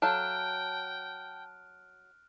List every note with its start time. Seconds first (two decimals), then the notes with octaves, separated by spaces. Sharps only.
0.02 F#3 A4 F5 G5 A5 F6 F#6 D7